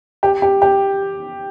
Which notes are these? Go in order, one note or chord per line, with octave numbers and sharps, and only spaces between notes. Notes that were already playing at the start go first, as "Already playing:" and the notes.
G4
G4
G4